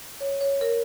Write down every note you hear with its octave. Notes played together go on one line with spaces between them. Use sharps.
C#5
C#5
A#4